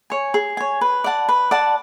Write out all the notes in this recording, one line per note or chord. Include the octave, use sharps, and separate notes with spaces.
C#5 G#5
G#4
C#5 G#5
B4
D5 F#5 A5
B4
D5 F#5 A5